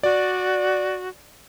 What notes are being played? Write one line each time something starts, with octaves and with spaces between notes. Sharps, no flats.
F#4 D5